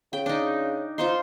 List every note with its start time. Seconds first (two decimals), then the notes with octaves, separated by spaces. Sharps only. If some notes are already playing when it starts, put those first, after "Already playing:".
0.13 C#3 G5
0.26 D4 D#4
0.98 D#4 F4 C5 C6